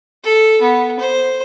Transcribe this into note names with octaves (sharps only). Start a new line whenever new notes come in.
A4
B3
C5